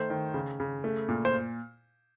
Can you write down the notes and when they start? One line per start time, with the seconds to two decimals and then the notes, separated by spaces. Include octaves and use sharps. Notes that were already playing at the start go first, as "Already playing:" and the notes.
Already playing: D#3 A3 C5
0.10 D#3
0.34 C#3
0.60 C#3
0.84 A3
1.09 A#2
1.25 C5